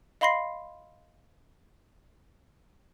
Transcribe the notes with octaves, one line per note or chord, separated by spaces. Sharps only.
D#5 F5 B5 C6 A#6 C7